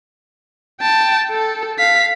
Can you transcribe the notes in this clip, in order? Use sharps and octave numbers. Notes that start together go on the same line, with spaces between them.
G5 A5
A4
F5 B6